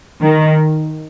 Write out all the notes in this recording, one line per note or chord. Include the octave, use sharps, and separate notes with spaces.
D#3